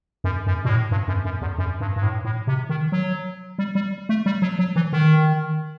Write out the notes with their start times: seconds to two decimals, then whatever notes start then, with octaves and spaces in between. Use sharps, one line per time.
0.24 F#2
0.47 F#2
0.65 B2
0.69 A2
0.91 G2
1.08 F#2
1.25 F#2
1.41 E2
1.58 F#2
1.80 G2
1.96 G2
2.03 A2
2.25 A2
2.47 C3
2.69 D#3
2.92 F#3
3.59 G3
3.75 G3
4.09 A3
4.26 G3
4.42 F#3
4.59 F#3
4.76 E3
4.93 D#3